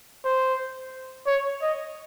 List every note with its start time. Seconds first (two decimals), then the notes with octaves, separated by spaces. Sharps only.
0.25 C5
1.27 C#5
1.62 D#5